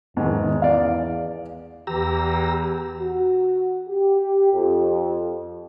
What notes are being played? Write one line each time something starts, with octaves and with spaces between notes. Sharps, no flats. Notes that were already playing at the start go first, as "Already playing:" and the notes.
E2 G#2 D#3
D5 F5
E2 E3 G4 A#5 E6
F#4
G4
F2